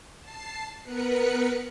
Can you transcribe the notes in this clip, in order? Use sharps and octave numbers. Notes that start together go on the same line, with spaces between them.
A5 C7
B3 A#4 B4 F#6 C#7